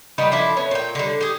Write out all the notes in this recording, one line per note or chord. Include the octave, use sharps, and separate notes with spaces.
D#3 G3 A#3 B3
F3 D4 E4 A4
B3 C#4 C#5
A#2 G5
D3 G3
G4 G#4